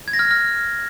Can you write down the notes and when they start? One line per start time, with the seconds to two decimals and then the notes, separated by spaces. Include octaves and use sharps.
0.08 G#6
0.13 A#6
0.19 F6
0.25 A#6
0.31 F6